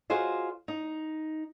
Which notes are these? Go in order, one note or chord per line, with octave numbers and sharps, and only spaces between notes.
F4 F#4 G#4 C5 D#5
D#4